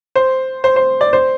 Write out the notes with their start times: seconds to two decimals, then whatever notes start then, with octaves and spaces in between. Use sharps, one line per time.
0.16 C5
0.64 C5
0.76 C5
1.01 D5
1.13 C5